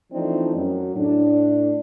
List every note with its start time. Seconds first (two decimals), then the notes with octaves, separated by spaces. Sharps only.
0.12 E3 F3 A3 C4 D4 D#4
0.55 F#2 F#3
0.96 A2 D4